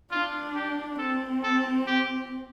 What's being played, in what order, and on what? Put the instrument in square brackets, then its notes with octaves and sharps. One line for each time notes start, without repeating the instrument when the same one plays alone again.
[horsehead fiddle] D4 [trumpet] F4
[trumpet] G4
[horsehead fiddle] C4 [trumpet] A4
[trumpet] A4
G4